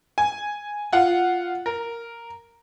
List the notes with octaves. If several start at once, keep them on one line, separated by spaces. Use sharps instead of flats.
G#5
F4 F#5
A#4